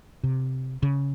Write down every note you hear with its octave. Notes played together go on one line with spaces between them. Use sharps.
C3
C#3